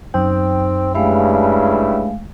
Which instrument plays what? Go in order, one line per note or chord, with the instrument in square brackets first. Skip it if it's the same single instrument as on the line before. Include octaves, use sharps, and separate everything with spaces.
[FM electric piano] F#2 G5 [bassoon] C4 [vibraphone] D#4
[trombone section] G2 C#3 [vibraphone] G#3 A3 F5 [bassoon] E4